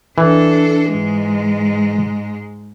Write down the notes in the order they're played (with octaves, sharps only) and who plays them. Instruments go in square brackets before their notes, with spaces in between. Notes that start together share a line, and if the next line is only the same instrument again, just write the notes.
[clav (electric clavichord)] E3 [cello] D4 A4
[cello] G#2 G#3